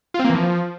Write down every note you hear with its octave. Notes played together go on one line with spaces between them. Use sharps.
F4
C4
A#3
E3
F3